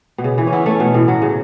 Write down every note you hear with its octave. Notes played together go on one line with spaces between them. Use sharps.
B2
C#3
E3
C#4
B3 E4
A3 C#4
B2
A2
F#3
C#3